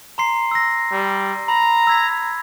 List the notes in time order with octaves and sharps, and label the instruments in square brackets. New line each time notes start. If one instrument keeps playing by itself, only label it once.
[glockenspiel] A#5 C6 C7
E6 A#6
[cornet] G3
[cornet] A#5 [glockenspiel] B5
[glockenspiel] E6 G#6 B6